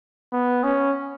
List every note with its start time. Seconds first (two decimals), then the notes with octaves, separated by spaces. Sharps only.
0.33 B3
0.64 C#4